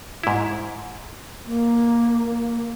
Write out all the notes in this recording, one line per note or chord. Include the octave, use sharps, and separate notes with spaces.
G#2 E4
A#3